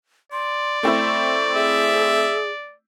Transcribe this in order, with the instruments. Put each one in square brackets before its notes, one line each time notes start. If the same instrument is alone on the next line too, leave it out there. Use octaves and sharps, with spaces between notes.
[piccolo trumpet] D5 [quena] C6
[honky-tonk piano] A3 C4 E4 [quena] C#6
[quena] G#4 [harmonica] E5